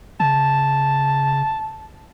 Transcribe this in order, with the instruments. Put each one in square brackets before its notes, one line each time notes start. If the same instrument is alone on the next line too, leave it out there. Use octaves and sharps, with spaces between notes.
[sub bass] C#3 [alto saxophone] A5